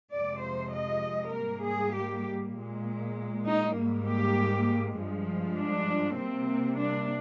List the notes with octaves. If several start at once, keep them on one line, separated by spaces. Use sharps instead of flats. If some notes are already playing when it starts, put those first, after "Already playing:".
F2 C3 F3 G#3 D5
C5
D#5
G#2 G3 A#3 A#4
G#4
G4
A#2 G#3
D#4
G#2 G3 A#3
G4
G2 F3 G#3
D4
C3 G3 A#3 C4
D4